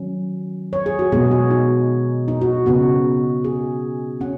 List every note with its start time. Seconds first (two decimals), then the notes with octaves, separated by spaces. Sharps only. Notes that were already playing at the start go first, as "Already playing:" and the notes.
Already playing: D#3 F#3 C#4
0.73 C#5
0.86 G#4
0.99 F#4
1.12 B2 G#3 B3 G#4
1.31 F#4
1.50 D#4
2.28 D#4
2.41 F#4
2.66 C#3 B3 F#4
3.44 G#4
4.21 C#4 F#5